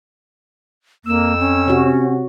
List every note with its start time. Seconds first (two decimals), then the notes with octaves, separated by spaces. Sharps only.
1.05 F2 A#3 E6
1.39 C#4
1.68 C3 F#4 C#5